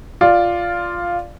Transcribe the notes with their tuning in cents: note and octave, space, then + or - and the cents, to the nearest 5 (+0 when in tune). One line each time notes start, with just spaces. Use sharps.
F4 +0 D5 +0